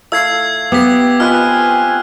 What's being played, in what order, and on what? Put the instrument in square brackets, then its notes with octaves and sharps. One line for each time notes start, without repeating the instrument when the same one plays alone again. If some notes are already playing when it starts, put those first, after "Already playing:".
[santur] A3 E4 F5 [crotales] E6 G#6 C7
[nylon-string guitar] B3 [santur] G4 [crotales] D#6 B6
[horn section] C4 G#5 [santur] F4 B4 D#5 [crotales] F6 F#6